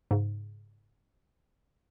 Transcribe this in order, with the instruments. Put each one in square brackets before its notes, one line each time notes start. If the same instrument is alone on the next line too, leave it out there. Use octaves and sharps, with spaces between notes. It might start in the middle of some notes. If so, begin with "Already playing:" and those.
[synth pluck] G#2 C#3